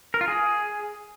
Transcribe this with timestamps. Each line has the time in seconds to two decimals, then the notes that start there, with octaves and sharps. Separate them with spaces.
0.14 A#4
0.21 F4
0.28 G#4